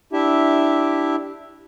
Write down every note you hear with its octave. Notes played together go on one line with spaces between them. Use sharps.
D4 E4 G4 E5